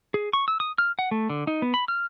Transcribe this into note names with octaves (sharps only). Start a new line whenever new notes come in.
G#4
C#6
E6
D#6
F6
F#5
A3
D3
D#4
B3
B5
F6